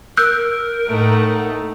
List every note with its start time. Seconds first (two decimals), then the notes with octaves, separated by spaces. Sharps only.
0.17 A#4 E6 F#6 G6
0.88 A2 A3 D#4 F#5 A#5